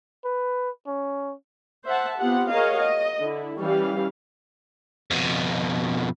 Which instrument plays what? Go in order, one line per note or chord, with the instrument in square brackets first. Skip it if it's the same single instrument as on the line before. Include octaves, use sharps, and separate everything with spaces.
[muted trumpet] B4
C#4
[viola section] C5 E5 F#5 A5
B3 C4 F4 G4 F#5
F#4 G#4 A#4 C#5 D#5 F5
D#5
D3 E4
E3 G3 C#4 G4 F5
[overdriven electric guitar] F2 B2